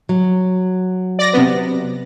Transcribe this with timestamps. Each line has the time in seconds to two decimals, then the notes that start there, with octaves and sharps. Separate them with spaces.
0.09 F#3
1.19 D5 A#6
1.33 C3 B3